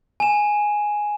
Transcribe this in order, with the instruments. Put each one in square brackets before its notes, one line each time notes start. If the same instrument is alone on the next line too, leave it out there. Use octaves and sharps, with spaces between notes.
[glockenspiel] G#5 E7